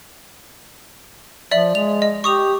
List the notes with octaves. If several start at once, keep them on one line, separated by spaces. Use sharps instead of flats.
F3 D5 E5 F#7
G#3 F7
D#5
G4 C#6 D#6 F7